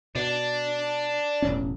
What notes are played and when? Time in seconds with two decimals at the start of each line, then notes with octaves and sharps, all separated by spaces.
0.15 B2 D4
1.42 E1 A1 C#4